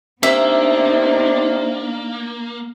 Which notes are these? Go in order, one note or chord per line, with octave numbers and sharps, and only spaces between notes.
C3 A#3 B3 D4 D#4 E5